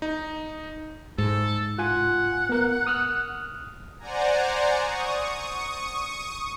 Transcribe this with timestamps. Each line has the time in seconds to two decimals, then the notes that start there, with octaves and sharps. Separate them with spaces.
0.02 D#4
1.18 G#2 A4
1.79 F4 F#5 G#5
2.49 B3 A#4
2.87 D#6 F6 F#6
3.99 C5 D5 F#5 G#5 A#5
4.80 C#6 D#6